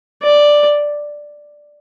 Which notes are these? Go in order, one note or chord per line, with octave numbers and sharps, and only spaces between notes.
D5